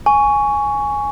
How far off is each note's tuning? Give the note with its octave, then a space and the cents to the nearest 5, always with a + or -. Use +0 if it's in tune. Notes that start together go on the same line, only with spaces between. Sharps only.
G#5 +0 C#6 +15